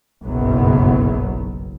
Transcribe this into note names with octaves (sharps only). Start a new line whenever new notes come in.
F#1 B1 G2 B2 F#3 B3